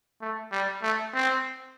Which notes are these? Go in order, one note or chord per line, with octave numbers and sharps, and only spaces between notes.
A3
G3
A3
C4